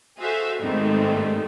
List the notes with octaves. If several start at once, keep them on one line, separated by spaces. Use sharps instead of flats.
F#4 G#4 A4 C5 E5 F5
G#2 D#3 G3 A3 C4 D#4